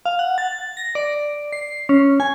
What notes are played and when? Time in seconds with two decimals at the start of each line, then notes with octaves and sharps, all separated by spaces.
0.06 F5
0.19 F#5
0.38 A6
0.77 A#6
0.95 D5
1.53 C7
1.89 C#4
2.20 G#5